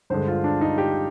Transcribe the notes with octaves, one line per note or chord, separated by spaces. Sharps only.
G2 D3 G#3 C5
F4
D4
D#4
G4